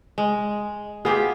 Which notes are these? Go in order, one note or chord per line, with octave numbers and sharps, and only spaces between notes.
G#3
B3 F4 G4 G#4